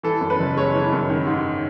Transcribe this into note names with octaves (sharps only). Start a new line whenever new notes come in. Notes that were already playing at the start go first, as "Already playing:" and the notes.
E3 A4
F#2
B4
F#1
G#3 C#5
E3
F#2
D#3
G#2